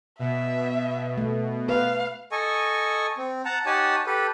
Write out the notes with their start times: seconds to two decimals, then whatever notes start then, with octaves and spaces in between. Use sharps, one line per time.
0.19 B2 E5
1.18 A3
1.69 B4 F5
2.32 A4 D#5 G#5 C#6
3.18 C4
3.45 F#5 A5 A#5
3.66 D#4 G4 C#5 F#5 G#5 A5
4.06 G4 A4 B4